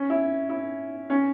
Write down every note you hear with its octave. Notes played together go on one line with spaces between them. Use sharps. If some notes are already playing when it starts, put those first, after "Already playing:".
Already playing: C#4
E4
E4
C#4